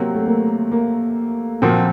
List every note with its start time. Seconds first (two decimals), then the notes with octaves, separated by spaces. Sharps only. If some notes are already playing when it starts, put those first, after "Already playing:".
Already playing: C3 F#3 A#3 C4
0.15 A3
0.27 A#3
0.72 A#3
1.62 A#2 F3 A#3 C4 F#4